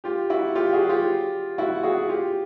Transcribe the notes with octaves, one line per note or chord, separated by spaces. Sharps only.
F4 G4
E4 F#4
F4 G4
F#4 G#4
F4 G4
E4 F#4
F#4 G#4
F4 G4